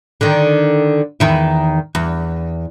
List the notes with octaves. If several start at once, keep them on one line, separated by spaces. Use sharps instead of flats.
D3 D#3
E2 D#3 E4
E2